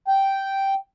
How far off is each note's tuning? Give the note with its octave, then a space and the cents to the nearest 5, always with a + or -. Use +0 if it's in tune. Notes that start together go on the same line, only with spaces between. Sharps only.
G5 -5